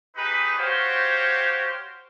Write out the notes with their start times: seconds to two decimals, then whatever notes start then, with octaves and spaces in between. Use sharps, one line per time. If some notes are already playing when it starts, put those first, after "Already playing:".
0.16 D#4 G4 G#4 B4
0.57 F#4 G4 C5 C#5 F5